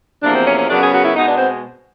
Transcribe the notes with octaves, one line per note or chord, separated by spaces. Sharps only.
E2 C3 F3 A#3 D4
C4
C#4
C#4
F#2 C#3 F#3 B3 D4
G#4
F#4
E4
B2 G#3 B3 D#4
D4
C4